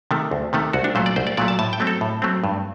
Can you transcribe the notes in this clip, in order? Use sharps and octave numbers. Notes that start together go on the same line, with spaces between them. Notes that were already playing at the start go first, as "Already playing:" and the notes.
C3 D#3 A3
D2
C3 D#3 A3
C2 F#4
D4
A#2 F#3 A3 C5
D5
C2 C5
D5
A#2 F#3 A3 D5
A5
A2 A5
G5
F#3 A3 C4
A4
A2
F#3 A3 C4
G2